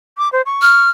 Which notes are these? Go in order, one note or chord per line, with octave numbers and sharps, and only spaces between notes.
D6
C5
C#6
F6